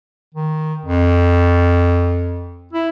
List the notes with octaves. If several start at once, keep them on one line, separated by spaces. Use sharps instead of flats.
D#3
F2
E4